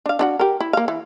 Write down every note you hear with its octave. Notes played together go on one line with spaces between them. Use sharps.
D4 F5
D4 E4 F#4
G4 A#4
E4
A#3 F5
E3